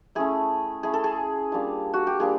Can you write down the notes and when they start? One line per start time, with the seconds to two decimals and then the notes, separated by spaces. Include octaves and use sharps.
0.15 A3 C#4 E4 G#4
0.83 A3 C#4 E4 G#4
0.93 A4
1.04 G#4
1.52 G3 A#3 D4 F4
1.93 F#4
2.07 G4
2.20 G3 A#3 D4 F4 G#4